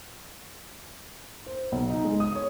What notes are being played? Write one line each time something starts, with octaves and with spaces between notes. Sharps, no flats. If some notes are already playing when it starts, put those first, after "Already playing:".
C5
B1
D#4
G#3
D#6
C#5